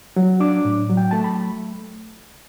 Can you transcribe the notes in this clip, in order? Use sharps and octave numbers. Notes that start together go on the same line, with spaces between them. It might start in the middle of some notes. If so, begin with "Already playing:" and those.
F#3
D4 D6
A2
F#3
G5
A3 A5
B5